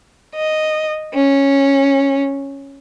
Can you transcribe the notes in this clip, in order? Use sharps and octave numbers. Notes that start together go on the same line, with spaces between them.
D#5
C#4